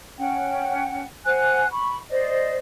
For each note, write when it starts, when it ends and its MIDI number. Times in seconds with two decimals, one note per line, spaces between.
0.18 1.02 61
0.18 1.02 78
0.18 1.02 79
1.25 1.66 72
1.25 1.66 78
1.25 1.66 80
1.25 1.66 90
1.70 1.96 83
1.70 1.96 85
2.10 2.56 72
2.10 2.56 74
2.10 2.56 75